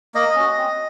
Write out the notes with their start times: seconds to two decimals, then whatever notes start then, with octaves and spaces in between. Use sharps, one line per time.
0.14 A#3 D#5
0.35 C#4 F#4
0.57 C4